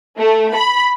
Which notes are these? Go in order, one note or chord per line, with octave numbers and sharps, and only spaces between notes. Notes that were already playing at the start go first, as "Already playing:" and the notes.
A3
B5